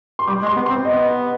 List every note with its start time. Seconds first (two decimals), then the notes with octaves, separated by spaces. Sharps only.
0.19 C6
0.27 G3 D6
0.42 G#3
0.46 C6
0.56 B3
0.66 C4 C6
0.84 B3 D#5